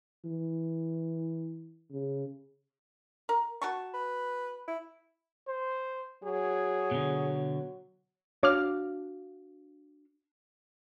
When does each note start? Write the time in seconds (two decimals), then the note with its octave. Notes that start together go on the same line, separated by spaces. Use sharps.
0.25 E3
1.91 C#3
3.29 A#4
3.62 F#4 A5 C#6
3.94 B4
4.68 E4
5.47 C5
6.23 F#3 G#4
6.91 B2 D3
8.43 D4 F#4 C#5 F5 D6 F6